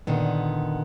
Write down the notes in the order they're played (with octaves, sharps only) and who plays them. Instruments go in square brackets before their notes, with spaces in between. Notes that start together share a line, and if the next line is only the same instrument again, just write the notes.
[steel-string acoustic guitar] A#2 D3 D#3 B3